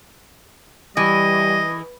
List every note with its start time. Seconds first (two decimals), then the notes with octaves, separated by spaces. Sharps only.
0.97 E3 G3 D#5